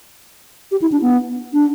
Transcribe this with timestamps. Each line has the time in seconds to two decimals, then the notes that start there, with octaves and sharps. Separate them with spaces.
0.71 G4
0.82 E4
0.92 D4
1.02 B3
1.53 D4